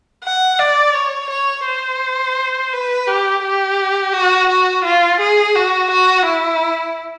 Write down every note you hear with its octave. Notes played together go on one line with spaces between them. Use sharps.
F#5
D5
C#5
C#5
C5
B4
G4
G4
F#4
F#4
F4
G#4
F#4
F#4
E4